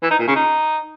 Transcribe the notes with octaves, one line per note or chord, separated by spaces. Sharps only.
E3
D#4
A#2
C#3
D#4